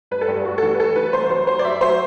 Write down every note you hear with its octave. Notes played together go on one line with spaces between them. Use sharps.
G2 B4
A4
G2 G4
G2 F#4
A4
E3 G4
B4
F#2 A4
E3 B4
C2 C5
F#3 C5
F#3 C5
D5
F#2 E5
F#3 C5